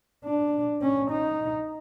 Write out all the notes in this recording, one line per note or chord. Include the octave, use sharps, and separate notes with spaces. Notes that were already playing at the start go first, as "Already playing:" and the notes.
D4
C#4
D#4